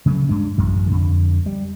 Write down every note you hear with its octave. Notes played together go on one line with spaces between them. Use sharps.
C#3 F#3 G#3 A3
G2 G#3 D4
A1 F#2
F2 D3
G3